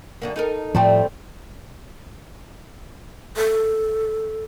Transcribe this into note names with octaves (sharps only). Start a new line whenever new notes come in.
F#2 D3 A#3
D#4 A4 A#4
A2 F3 G3 A3 C4
A4